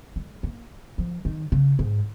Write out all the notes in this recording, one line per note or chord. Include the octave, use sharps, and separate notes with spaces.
G#3
A#3
F3
D#3
C#3
G#2